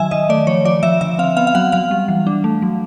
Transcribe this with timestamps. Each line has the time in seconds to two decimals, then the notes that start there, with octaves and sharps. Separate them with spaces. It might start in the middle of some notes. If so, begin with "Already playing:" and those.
Already playing: D#3 F#3 E5 G#5
0.11 D#3 D#5
0.29 A3 D5
0.47 F3 C#5
0.65 F3 D5
0.83 F3 E5
1.01 D3 E5
1.18 C4 F5
1.37 B3 F5
1.47 F5
1.55 F#3 F#5
1.72 F#3 F5
1.91 G3
2.08 E3
2.27 D4
2.44 A3
2.62 F#3